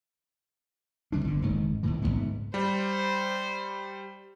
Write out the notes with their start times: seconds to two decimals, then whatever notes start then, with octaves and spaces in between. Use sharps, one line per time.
1.12 C#2 F3 G3 D4
1.25 G1 D3
1.42 F1 G#2 D#3
1.83 D#2 A2 E3
2.02 F#1 E2 G#2 B3
2.54 G3 C5